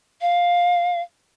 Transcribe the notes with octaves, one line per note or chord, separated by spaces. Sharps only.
F5